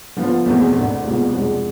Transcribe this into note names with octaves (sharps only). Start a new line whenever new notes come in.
D3 F3 B3 F4
E2 B2 A3 C4 G#4
D2 D3 A3 D4
C2 B2 G#3 D4 F4
F2 C3 G#3 D4